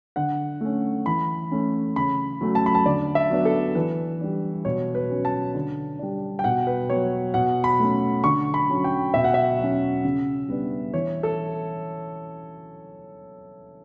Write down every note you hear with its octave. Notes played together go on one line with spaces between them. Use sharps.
D3 F#5
A3 C#4
E3 B5
A3 C#4
C#3 B5
F#3 A3 C#4
A5
B5
A5
D3 D5
E5
F#3 B3 D4
A4
E3 B4
G3 D4
B2 C#5
B4
F#3 C#4
A5
D3
G3 D4
G5
B2 F#5
B4
F#3 B3 C#5
B2 F#5
B5
A3 C#4
D3 C#6
B5
F#3 C#4
G5
B2 E5
F#5
E5
F#3
C#4
C#3
G3 B3 D4
E3 C#5
A4